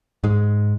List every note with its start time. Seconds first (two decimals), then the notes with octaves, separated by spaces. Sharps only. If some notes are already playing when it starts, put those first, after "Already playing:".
0.24 G#2 G#3